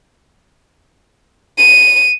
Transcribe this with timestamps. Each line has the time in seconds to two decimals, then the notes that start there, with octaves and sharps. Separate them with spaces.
1.58 D#7